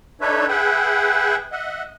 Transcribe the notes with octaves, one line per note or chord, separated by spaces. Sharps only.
D4 D#4 A4 B4 C#5 E5
G#4 B4 E5 F#5 G5
D#5 E5 F#5